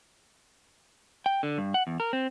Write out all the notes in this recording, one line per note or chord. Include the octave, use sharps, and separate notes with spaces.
G5
D3
G2
F#5
E2
A#4
C4